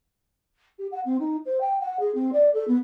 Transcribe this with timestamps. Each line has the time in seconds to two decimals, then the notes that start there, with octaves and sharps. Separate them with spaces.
0.78 G4
0.91 F#5
1.05 C4
1.19 D#4
1.45 C5
1.60 G5
1.80 F#5
1.99 G#4
2.14 C4
2.32 D5
2.53 A4
2.67 B3